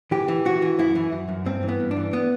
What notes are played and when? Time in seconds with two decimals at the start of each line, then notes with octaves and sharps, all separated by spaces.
0.11 E3 G4
0.28 E3
0.45 E3 F#4
0.62 E3
0.79 F#2 E4
0.95 E3
1.12 F#2
1.29 F#2
1.46 G2 C4
1.63 E3
1.68 B3
1.80 G2
1.91 D4
1.97 E3
2.13 B3